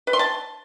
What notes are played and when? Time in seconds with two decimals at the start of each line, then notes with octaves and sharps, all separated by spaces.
0.07 B4
0.13 C6
0.19 A5